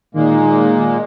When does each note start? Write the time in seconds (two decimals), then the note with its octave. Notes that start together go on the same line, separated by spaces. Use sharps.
0.15 A#2 D#3 G#3 A#3